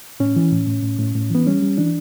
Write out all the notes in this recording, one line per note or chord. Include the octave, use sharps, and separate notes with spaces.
A2 C#4
E3
A2
A2
A2
A2
A2
E3 B3
G3 C#4
G3
E3 D4